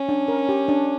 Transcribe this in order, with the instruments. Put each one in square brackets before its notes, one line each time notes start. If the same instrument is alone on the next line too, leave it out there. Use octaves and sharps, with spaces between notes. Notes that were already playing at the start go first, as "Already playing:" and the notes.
Already playing: [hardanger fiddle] C#4
[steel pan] D4
A#4
G4
D4